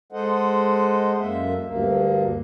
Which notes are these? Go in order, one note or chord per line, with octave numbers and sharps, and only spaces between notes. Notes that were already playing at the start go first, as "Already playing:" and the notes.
G#3 A4 C5 D#5 F#5
F#2 A#3 E5
D2 G2 A#3